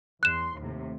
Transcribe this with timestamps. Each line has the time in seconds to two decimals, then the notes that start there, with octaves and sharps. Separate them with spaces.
0.23 E2 C6 F#6 E7
0.58 D#2 A2 C3